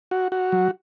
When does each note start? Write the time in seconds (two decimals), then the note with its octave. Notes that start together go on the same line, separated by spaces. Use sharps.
0.11 F#4
0.32 F#4
0.52 F#3